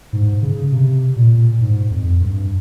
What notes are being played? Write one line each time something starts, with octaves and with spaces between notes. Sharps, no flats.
G#2
C#3
C3
A#2
G#2
F2
G2